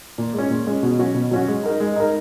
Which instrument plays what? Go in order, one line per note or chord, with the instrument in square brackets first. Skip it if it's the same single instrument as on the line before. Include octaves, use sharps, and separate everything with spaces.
[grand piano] A#2
G#3 C#4
A#2
G#3 C#4
B2
F#3 C#4 F#4
B2
F#3 C#4 F#4
G#3
D#4 A#4
G#3
D#4 A#4